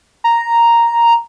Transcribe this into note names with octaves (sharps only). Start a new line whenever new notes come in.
A#5